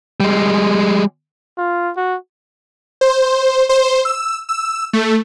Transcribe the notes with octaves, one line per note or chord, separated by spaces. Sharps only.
G3 G#3
F4
F#4
C5
C5
E6
E6
A3